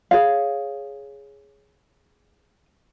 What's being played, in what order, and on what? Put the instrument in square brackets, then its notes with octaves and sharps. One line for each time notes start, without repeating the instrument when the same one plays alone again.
[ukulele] G#4 C#5 F5